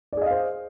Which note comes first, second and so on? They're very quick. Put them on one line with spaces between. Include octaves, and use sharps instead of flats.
D5 G#4 D#5 F5 C5